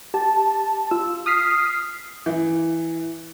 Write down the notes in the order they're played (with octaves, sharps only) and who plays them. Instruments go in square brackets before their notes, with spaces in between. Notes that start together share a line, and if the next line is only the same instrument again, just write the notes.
[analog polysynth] G4 A5
F4 E6
D#6 F6 B6 C7
[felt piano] E3